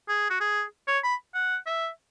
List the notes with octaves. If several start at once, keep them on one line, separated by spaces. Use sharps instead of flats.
G#4
F#4
G#4
C#5
B5
F#5
E5